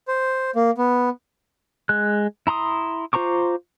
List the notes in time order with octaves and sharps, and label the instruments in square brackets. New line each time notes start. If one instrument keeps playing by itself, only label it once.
[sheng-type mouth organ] C5
A#3
B3
[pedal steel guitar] G#3 F#6
E4 A#5 C6 D#6
F4 C5 A#5 C#6 D6